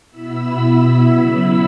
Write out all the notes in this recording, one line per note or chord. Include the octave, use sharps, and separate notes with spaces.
B2 B3 E4 B5 E6
C#3 F#3 B3 E4 B5 E6